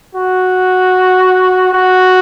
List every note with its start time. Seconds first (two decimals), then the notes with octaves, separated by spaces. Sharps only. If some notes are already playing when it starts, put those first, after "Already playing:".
0.15 F#4
1.73 F#4